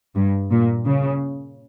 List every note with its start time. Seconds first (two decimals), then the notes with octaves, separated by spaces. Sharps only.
0.15 G2
0.51 A#2
0.85 C#3